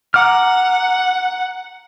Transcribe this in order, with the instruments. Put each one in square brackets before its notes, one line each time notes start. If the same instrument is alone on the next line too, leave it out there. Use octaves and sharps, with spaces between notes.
[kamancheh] F#5 [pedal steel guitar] A#5 D6 F6